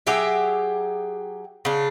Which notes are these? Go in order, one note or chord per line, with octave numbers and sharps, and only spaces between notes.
F#3 G4 G#4 E5
C#3 D4